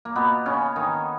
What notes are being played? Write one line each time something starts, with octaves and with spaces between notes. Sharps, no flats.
A#3
B2 B3
C#3 C#4
D#3 D#4